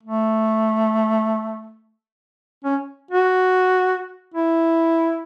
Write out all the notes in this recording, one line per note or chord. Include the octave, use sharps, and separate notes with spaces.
A3
C#4
F#4
E4